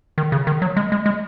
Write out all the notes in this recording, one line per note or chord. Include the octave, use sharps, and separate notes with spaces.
D#3
C#3
D#3
F#3
G#3
G#3
G#3